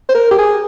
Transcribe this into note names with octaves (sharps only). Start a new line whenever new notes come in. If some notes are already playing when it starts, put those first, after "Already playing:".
C5
A#4
G4
G#4